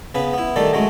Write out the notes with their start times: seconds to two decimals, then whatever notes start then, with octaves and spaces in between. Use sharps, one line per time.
0.15 C#3 B3 B4
0.34 B3 E4
0.56 D#3 G3 A3 A4 D5
0.73 F#3 G#3 A3 C#4